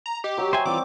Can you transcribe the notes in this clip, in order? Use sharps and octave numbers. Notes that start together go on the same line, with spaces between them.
A#5
G4 D#5
F#3 C#6
C5 E5 G5 G#5
E3 G3 C4 F4 D6